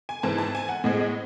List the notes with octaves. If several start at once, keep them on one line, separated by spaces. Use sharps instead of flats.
G#5
G#2 E3 C4 A5
A5
G#5
F#5
A2 G#3 C4 D#5
D#5